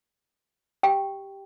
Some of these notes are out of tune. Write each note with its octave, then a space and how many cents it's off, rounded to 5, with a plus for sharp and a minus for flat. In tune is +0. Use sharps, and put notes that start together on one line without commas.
G4 +0 G5 +0